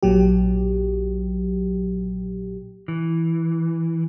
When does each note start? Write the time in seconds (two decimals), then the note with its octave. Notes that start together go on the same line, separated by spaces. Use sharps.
0.03 A#1 A#2 F#3 G4
2.88 E3